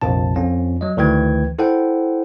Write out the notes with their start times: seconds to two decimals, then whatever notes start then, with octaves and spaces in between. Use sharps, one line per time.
0.02 A#1 F2 C3 A5
0.35 F2 C#4
0.81 F#3 D#5
0.97 D2 D#3 E3 B4 G5 G#6
1.59 E4 A4 C5 F#5 G5